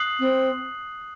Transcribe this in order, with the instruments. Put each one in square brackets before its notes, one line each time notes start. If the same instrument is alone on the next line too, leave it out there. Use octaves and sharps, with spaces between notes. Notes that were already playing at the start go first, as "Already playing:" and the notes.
Already playing: [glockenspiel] D#6 F#6 C7 F#7
[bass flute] C4